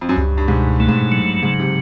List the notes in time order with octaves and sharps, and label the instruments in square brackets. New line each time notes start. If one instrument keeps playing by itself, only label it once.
[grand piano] F2
F#2
[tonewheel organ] C#2 [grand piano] G2
[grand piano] G2
[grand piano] G#2 [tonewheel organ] B2
[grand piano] A2 [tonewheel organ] A3
[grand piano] G#2
A2
[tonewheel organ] F#3
[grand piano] G#2 [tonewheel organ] C#3
[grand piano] C3